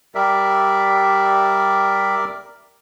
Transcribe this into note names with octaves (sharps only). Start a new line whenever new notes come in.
G3 A#4 D5 E5